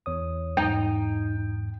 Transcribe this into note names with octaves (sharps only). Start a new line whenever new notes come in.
E2 C#5 D#6
E2 G#2 D#4 G5